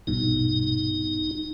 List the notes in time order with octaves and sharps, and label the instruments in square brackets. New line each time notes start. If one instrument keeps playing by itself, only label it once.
[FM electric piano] A#1 G2 B2 [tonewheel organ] D#4